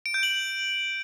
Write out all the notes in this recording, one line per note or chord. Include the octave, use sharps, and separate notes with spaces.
D7
G6
F#7